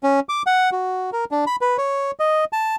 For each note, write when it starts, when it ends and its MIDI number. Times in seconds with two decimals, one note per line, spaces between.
0.03 0.20 61
0.29 0.42 86
0.47 0.70 78
0.72 1.10 66
1.13 1.25 70
1.31 1.45 62
1.47 1.56 83
1.61 1.77 71
1.78 2.11 73
2.20 2.45 75
2.53 2.76 81